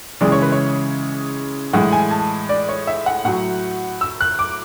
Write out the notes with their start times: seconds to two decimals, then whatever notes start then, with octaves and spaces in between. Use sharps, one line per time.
0.21 C#3 E3 G#3 D5
0.32 C#5
0.42 B4
0.52 C#5
1.73 A2 E3 G#3 F#5
1.93 G#5
2.11 A5
2.49 D5
2.69 C#5
2.87 E5
3.06 F#5
3.25 A2 F#3 F#5
4.01 E6
4.21 F#6
4.39 D6